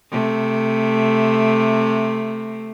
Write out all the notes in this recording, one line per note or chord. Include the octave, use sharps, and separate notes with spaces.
C3 A3